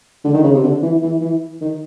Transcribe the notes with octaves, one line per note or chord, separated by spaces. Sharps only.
D3
D#3
C#3
C3
D3
E3
E3
E3
D#3